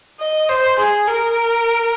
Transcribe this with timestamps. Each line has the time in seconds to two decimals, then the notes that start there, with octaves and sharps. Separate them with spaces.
0.20 D#5
0.49 C5
0.79 G#4
1.08 A#4